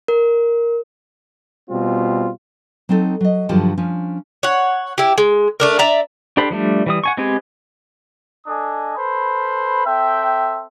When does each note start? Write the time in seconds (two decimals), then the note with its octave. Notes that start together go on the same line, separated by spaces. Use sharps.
0.08 A#4
1.70 B2 G3 C4 F4
2.89 F#3 C4 D#4 A4
3.21 F#3 D#5
3.49 G2 D3 F3 F#3 G4 A5
3.78 F3 C#4 D4
4.43 C#5 F#5
4.98 E4 G4
5.18 G#3
5.60 A3 D4 A#4
5.79 D5 E5 A#5
6.37 D4 G4 A4 C5 B5
6.50 F3 G3 A3 D4
6.86 E3 G3 D#6
7.04 F#5 G#5 C#6
7.17 G#3 B3 C4 G4 G#5
8.47 D4 A4 D#5 G#5 D#6
8.97 A4 B4 C5 B5
9.86 C4 A4 E5 G5